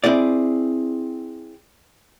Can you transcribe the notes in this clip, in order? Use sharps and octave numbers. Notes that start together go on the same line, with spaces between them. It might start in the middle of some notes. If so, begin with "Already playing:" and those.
C4 E4 G#4 D5